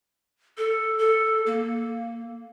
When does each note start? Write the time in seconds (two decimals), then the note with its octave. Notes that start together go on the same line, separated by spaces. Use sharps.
0.57 A4
0.98 A4
1.46 A#3